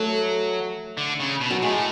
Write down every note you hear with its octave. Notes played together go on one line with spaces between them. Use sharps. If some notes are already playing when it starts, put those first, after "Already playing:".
Already playing: F#3 A3
D3
C#3
B2
F#3
A2 G#3